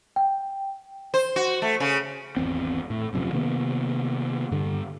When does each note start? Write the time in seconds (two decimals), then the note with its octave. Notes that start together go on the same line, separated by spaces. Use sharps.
0.16 G5
1.14 C5
1.36 F#4
1.62 A3
1.80 C#3
2.37 G#1 E2 C4
2.90 A2
3.13 D#1 F#2 C3 F3
3.33 C3 D#3 A#3 B3
4.51 G2 D3